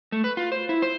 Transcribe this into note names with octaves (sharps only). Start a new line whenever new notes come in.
A3
B4
F4
C5
E4
C5